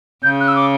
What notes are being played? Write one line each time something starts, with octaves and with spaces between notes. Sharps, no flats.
C#3 G6
F#6
E6
D6